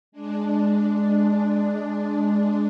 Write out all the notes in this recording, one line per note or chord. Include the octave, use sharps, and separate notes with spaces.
G#3 D4